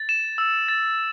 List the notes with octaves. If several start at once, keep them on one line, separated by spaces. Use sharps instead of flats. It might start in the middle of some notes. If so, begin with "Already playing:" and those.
Already playing: A6
E7
E6
A6